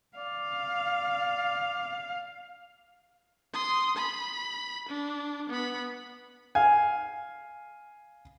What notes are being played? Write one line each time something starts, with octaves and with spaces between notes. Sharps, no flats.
D5 F5
C6 D#6
B5
D4
B3 B5
F5 G#5